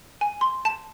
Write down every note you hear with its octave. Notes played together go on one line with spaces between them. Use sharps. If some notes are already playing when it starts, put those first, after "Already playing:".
G#5
C6
A5